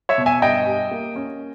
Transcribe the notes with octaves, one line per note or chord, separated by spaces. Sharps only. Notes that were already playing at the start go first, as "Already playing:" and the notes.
C#5 E5
B2
E5 G#5
G2 D#5 G5
G3
A#3
C#4